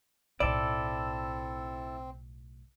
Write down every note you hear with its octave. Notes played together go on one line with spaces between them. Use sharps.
B1 A2 C4 E4 A4 D5